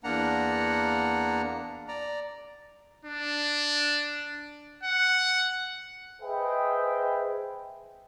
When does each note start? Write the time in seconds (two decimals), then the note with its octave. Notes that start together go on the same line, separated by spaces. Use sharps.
0.04 E2 A#3 D4 F#5 A#5
1.88 D5 A#5
3.05 D4
4.83 F#5
6.22 G#4 B4 C5 D#5 E5 G5